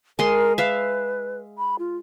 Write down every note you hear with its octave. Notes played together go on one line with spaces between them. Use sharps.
G#3 A#4 C6
B4 E5 F5
B5
F4